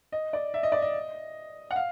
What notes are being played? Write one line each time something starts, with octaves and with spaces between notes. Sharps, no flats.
D#5
D5
E5
D#5
D5
D#5
F#5
F5